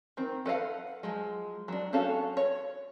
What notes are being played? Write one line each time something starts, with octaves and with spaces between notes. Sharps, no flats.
D#3 C4
A4 B4 D#5 F5 F#5
F3 F#3 G#3
F#3 D4
C4 C#4 F#4 A4 F5
C#5